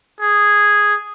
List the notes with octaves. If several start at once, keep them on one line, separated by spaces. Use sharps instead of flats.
G#4